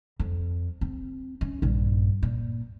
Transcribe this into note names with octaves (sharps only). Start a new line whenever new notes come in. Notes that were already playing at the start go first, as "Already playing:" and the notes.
F2
C4
C#4
A#1 G2
A#2